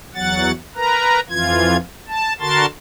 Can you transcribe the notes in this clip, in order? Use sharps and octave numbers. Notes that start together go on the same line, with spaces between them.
E2 F#3 F#5 A6
A#4 B4 A#5
F2 E3 F4 G#6
A5
D3 F#4 A#4 A5 C6 A6